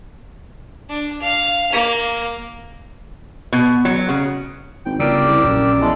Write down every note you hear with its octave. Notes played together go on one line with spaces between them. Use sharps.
D4
F5
A#3
B2
F#3
C#3
G#1 G5
G1 C#3 G4 A#4 D5 E6
C2
A#1 F#2
E2 G#3 A3